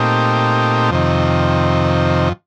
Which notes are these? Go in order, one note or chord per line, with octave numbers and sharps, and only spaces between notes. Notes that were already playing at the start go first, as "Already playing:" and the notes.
Already playing: A#2 A3 C4 D#4 G4
F2 C3 D#3